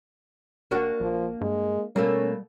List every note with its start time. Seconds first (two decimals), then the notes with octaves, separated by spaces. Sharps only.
0.71 E1 A#3 D4 F#4
1.00 A#1 F3
1.41 G2 G#3
1.96 B2 G3 A3 A#3 C#4